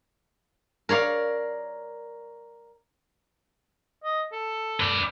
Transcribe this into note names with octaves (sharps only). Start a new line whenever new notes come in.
A#4 C#5 D5 F5
D#5
A4
B4 D5